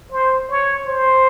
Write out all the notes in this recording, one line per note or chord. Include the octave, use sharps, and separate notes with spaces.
C5
C#5
C5